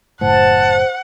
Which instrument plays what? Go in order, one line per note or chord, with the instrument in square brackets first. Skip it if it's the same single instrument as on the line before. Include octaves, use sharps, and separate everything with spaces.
[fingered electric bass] F#1 A2 [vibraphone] C5 [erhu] F#5 [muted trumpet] A5